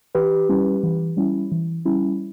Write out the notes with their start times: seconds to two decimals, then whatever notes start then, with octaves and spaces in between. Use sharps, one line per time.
0.15 E3 G4 B4
0.49 G3 C#4 E4
0.83 E3
1.17 G3 C#4 E4
1.52 E3
1.85 G3 C#4 E4